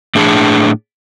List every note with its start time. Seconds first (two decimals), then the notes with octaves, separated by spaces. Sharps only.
0.15 A2 D4 G#4 A5